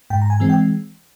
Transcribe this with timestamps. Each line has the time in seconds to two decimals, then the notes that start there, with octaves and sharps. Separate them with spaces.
0.10 G#2 G5
0.22 A#5
0.30 G#5
0.40 E3 G#3 C4
0.50 G5